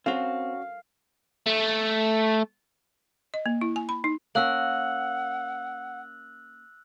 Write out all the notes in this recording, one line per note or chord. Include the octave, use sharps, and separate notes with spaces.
C4 C#4 F#4 F5
A3
D#5
A#3
E4
G#5
B5
D#4
A#3 C#4 A#4 F#5 E6 F#6 F#7